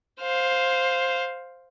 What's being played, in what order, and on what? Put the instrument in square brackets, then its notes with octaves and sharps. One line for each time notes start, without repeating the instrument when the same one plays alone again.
[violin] C5 F5